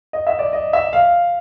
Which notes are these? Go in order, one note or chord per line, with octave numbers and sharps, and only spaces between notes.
D#5
E5
D5
D#5
E5
F5